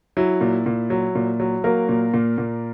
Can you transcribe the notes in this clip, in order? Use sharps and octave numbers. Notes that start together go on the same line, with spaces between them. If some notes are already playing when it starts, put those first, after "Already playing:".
F#3 E4
A#2
A#2
F#3
A#2
F#3
F#3 A#3 A#4
A#2
A#2
A#2